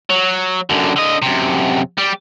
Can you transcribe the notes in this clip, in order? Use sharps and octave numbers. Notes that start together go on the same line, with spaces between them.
F#3
F#2 D3
D3 D#5
F#2 C3
G3 G4